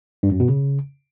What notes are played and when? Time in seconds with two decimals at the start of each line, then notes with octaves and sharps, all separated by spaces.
0.23 G2
0.32 F#2
0.40 B2
0.49 C#3